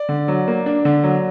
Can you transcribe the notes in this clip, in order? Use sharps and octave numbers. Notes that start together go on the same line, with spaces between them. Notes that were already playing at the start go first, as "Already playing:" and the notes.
Already playing: D5
D3
F#3
A#3
D4
D3
F#3